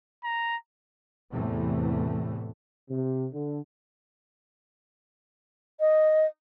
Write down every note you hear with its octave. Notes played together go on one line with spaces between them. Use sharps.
A#5
E2 A2 C3 E3 A3
C3
D3
D#5